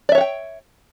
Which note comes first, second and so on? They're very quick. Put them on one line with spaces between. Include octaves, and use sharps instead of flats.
D5 E5 C#5 F#5 G5